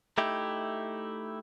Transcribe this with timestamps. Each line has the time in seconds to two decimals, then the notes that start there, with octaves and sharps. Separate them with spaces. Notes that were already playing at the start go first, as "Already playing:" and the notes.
0.18 A3 D#4 E4 G4